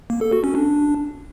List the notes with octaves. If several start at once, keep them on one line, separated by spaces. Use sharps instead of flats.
A#3
A4
F#4
C#4
D4